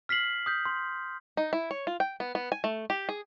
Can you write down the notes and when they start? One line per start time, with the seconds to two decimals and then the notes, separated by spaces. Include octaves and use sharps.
0.09 F6 B6 C7 F#7
0.46 D#6 G6 B6
0.65 C6
1.37 D#4
1.53 E4
1.71 C#5
1.87 F4
2.00 G5
2.20 B3
2.35 B3
2.52 G#5
2.64 A3
2.90 G4
3.09 G#4